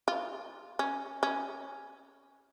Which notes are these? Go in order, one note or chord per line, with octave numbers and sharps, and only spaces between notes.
F4
C#4
C#4